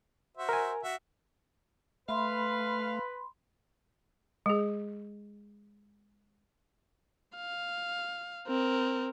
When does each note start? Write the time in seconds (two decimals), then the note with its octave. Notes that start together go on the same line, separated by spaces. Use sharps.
0.37 F#4 C5 E5
0.49 A#4 G#5
0.83 F#4 E5
2.09 A3 B4 F5 B5 C6
4.46 G#3 G#4
7.37 F5
8.48 C4 A#4